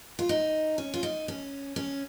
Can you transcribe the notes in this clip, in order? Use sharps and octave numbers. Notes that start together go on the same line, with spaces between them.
F4
D#4
C#4
F4
D#4
C#4
C#4